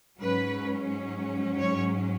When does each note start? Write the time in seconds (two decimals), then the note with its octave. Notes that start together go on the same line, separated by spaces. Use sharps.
0.19 G#2 F#3 C#4 B4
1.58 C#5